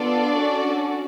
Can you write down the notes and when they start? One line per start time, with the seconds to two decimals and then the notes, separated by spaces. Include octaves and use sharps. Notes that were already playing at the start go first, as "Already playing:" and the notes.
Already playing: B3 D4 F4 A4 D5
0.36 C#4 F#4 A4